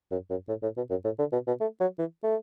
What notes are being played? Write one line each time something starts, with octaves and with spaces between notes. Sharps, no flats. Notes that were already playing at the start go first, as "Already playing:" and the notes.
F#2
F#2
A2
A2
B2
F#2
A2
D3
B2
B2
A3
F#3
E3
A3